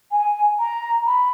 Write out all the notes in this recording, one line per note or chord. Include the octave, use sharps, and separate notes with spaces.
G#5
A#5
B5